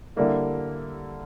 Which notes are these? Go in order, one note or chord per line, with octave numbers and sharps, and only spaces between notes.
D3 G3 A#3 E4